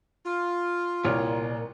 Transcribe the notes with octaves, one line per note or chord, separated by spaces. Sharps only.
F4
C2 A#2 C#5 F6